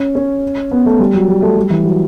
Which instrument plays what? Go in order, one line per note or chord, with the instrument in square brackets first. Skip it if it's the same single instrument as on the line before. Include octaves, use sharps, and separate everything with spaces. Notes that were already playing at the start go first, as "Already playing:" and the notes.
Already playing: [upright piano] C#4
C#4
B3
A3
G3
F#3
G3
A3
G3
E3
F#3